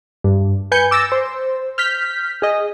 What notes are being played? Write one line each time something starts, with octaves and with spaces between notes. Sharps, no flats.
G2
B4 G#5 G6 C#7
D6 E6 A6 A#6
C5
F6 G6 B6
G#4 D#5